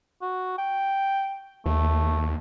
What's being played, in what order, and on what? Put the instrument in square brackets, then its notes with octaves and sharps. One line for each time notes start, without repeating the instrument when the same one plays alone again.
[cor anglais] F#4
G5
[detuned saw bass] D#2 [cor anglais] A3